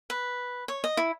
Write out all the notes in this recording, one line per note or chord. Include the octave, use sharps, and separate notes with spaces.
B4
C#5
D#5
E4